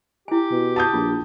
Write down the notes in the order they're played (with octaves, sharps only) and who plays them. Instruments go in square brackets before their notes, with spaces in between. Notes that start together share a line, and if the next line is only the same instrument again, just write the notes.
[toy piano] E4 G#5 [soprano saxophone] G4
[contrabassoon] B2
[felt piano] A5 D#6 G6
[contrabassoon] A#1 [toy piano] F4